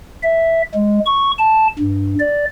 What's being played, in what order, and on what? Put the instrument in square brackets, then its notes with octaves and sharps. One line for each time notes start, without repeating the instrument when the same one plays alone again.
[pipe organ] E5
G#3
C#6
A5
G2
D5